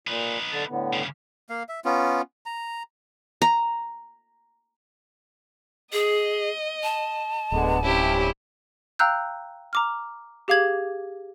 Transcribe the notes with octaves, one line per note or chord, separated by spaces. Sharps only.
A#2 D#4 B4
D3 A5
A2 D3 B3
G2 C#3
A#3 F5
E5
B3 C#4 F4
A#5
A#5
G#4 D#5
A5
D1 D3 G#3 B3
G2 C3 C#4 E4 G4
F5 G5 A#5 E6 F#6 G6
A#5 D6 F6
G4 G#4 F5 D6 G#6 F#7